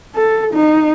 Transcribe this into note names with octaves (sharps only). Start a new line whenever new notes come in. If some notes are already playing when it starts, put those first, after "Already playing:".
A4
D#4